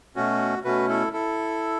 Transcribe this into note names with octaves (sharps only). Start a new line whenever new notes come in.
B2 A3 C#4 F#4
B2 A3 C#4 F#4 B4
E4 A4
E4 A4